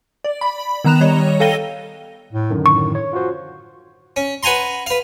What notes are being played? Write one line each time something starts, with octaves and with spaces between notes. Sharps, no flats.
D5
B5
D#3 B3 A#5 F#6 E7 F7
G3 C#5 D#5
A4 F5 G5 A#6 D#7 G7
A2
F#2 D3 D#3
A2 C#6
C#5
F4 F#4 C5
C#4
B4 F#5 G#5 A#5 C6
B4 F5